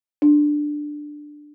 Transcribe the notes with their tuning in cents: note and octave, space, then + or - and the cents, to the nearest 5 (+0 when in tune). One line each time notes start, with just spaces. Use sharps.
D4 +10